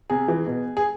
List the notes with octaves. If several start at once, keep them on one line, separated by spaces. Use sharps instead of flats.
C3 G#4
E3
B2
G#4